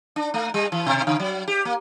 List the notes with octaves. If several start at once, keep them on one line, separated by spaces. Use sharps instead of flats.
D4
A3
G3
E3
B2
C#3
F#3
G4
A#3